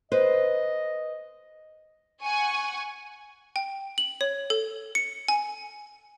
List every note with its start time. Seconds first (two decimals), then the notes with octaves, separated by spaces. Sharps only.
0.12 B4 C5 D#5
2.22 F#5 G#5 C#6
3.56 G5
3.98 F#7
4.21 C#5
4.50 A4
4.95 C#7
5.28 G#5